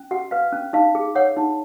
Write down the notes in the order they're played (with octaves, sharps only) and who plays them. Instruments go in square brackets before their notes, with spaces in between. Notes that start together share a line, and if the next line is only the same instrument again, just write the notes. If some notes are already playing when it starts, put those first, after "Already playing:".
Already playing: [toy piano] C#4
F#4 F#5
B4 F5
C#4
D#4 F5
G#4
C#5 F#5
D#4